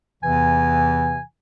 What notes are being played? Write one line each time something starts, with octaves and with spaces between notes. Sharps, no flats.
E2 C3 E3 G#5